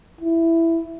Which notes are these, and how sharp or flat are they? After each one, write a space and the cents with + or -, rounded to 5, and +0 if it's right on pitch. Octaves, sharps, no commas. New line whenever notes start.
E4 +5